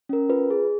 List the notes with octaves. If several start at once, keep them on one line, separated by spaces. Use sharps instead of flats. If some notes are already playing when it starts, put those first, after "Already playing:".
C#4 A#4
F4 B4
G#4